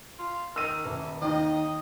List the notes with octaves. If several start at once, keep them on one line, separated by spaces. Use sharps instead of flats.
F4
D#3 E6 D#7
D#1 E3
D#2 D#3 D#5